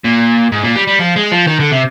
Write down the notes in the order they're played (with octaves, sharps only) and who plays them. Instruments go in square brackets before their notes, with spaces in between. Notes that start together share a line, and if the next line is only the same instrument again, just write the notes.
[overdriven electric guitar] A#2
G#2
A#2
G3
G3
F3
G#3
F3
D#3
D3
C3